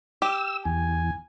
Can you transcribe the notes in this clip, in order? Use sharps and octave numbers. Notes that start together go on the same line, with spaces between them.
G4 E6
E2 G#5